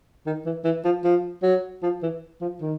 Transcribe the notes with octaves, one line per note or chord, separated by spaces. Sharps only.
D#3
E3
E3
F3
F3
F#3
F3
E3
F3
D#3